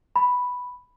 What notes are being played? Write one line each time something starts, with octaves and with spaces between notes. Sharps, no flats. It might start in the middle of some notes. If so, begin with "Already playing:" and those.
B5